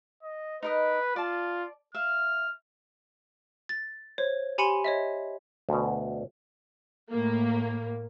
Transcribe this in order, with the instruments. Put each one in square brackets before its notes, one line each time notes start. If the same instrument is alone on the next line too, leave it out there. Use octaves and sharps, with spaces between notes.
[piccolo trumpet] D#5
[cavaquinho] D#4 A#4 D#5 [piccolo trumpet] B4
[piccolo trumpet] F4 [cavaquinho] D5 A5
[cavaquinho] E5 F5 [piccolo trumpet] F6
[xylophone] A6
C5 C#5
G4 G#5 B5 C6 C#7 D#7
C#5 D#5 E5
[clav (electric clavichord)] D2 B2
[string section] A2 A#3